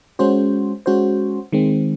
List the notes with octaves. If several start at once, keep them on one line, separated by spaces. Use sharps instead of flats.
G#3 C#4 F#4 C5
G#3 C#4 F#4 C5
D#3 G#3 C4